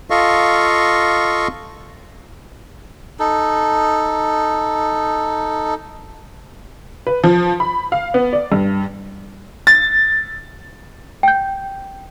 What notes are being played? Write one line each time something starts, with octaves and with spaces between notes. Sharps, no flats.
F4 A4 D#5 F5 C#6
D#4 A4
B4
F3
B5
F5
B3
D5
G2
A6
G5 G6